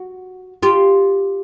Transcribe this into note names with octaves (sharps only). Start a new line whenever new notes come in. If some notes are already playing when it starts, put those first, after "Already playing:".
Already playing: F#4
F4 G4